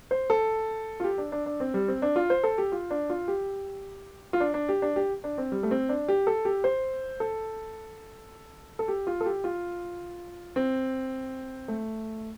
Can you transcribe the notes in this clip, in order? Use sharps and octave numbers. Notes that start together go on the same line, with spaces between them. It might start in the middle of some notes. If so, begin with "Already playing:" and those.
C5
A4
F4
G4
D4
D4
D4
C4
G3
C4
D4
F4
C5
A4
G4
F4
D4
F4
G4
F4
D4
D4
G4
D4
G4
D4
C4
G3
A3
C4
D4
G4
A4
G4
C5
A4
A4
G4
F4
A4
G4
F4
C4
A3